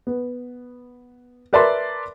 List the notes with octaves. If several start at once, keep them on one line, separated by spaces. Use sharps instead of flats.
B3
A#4 B4 D5 E5 A5 C6